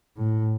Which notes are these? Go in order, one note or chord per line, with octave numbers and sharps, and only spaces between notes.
A2